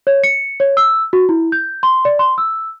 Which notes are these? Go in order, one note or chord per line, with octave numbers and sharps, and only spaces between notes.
C#5
C#7
C#5
E6
F#4
E4
G6
C6
D5
C6
E6